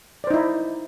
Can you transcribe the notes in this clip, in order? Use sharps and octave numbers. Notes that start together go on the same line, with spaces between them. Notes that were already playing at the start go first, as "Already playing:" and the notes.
D#4 E4 C5 D5